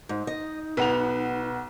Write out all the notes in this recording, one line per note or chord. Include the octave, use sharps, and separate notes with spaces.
G#2 D#4
D#5
B1 B4 F#5 F7